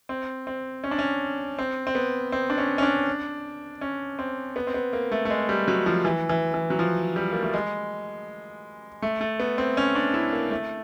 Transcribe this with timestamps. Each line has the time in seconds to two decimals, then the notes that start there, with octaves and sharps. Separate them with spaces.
0.09 C4
0.47 C4
0.84 C#4
0.91 D4
0.99 C#4
1.59 C4
1.87 C4
1.95 B3
2.32 C4
2.50 D4
2.58 C#4
2.78 C#4
2.83 D4
3.81 C#4
4.19 C4
4.56 B3
4.67 C4
4.74 B3
4.93 A#3
5.12 A3
5.25 A3
5.30 G#3
5.49 G3
5.68 F#3
5.86 F3
6.05 E3
6.29 E3
6.54 E3
6.70 F#3
6.79 F3
7.16 G3
7.32 A#3
7.42 A3
7.54 G#3
9.02 A3
9.21 A3
9.40 B3
9.58 C4
9.77 C#4
9.95 D4
10.14 E4
10.32 A#3
10.51 A3